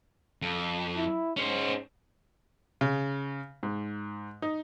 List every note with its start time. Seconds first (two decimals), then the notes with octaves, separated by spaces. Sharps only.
0.42 F2
0.96 E4
1.37 G#2 C#4 C5
2.81 C#3
3.63 G#2
4.42 D#4